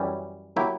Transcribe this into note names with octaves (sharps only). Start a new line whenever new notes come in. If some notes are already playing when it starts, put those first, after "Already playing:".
Already playing: F#2 E3 G3 C#4
F#3 A#3 E4 G4